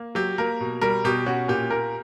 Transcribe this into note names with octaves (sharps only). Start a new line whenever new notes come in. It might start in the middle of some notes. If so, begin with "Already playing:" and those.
Already playing: A#3
F#3 G4
A#3 A#4
B2
G3 A#4
B2 G4
C#4 F#4
A#2 G4
A#3 A#4